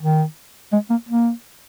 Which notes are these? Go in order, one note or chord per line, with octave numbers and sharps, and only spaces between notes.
D#3
G#3
A#3
A#3